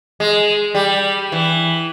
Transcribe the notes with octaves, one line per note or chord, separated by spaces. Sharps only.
G#3
G3
E3